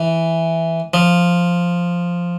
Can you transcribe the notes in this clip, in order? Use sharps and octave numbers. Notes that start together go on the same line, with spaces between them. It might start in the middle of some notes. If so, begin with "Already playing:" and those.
Already playing: E3
F3